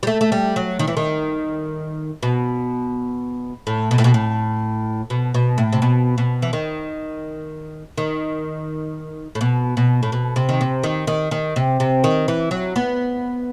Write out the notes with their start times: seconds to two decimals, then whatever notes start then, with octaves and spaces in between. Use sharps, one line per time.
0.03 G3
0.07 A3
0.21 A3
0.32 G3
0.56 F#3
0.79 D#3
0.87 E3
0.97 D#3
2.23 B2
3.67 A2
3.91 B2
3.98 A2
4.04 B2
4.14 A2
5.10 B2
5.34 B2
5.58 A2
5.73 C3
5.82 B2
6.18 B2
6.42 E3
6.53 D#3
7.98 D#3
9.35 A2
9.41 B2
9.77 B2
10.03 A2
10.12 B2
10.36 C3
10.49 D#3
10.61 C3
10.83 D#3
11.07 D#3
11.31 D#3
11.56 C3
11.80 C3
12.04 D#3
12.28 E3
12.51 F#3
12.76 B3